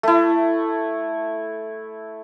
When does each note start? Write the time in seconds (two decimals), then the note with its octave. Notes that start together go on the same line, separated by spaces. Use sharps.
0.03 A3 E4